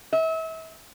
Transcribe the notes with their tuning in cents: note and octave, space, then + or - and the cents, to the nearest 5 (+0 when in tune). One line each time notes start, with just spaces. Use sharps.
E5 -35